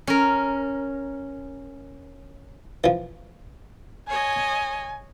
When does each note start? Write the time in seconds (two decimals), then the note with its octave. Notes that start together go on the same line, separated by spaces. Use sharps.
0.07 C#4 A#4
2.84 E3 F3
4.09 C#5 D#5 G#5